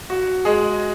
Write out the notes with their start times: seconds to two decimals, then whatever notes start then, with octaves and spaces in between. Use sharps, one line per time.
0.10 F#4
0.45 G#3 G#4